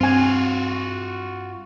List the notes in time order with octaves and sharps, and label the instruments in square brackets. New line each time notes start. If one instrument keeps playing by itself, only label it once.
[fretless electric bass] G2 [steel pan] C4 G#5 [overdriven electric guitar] F4 F#4